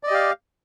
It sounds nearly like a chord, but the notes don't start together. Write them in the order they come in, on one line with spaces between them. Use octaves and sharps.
D5 D#5 G4 F5